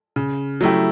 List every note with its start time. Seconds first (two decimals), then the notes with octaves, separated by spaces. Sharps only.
0.16 C#3
0.61 F#3 A3 E4 G4